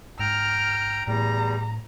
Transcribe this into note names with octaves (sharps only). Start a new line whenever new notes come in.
G#2 G5 A#5 F6
E2 A2 G3 A#5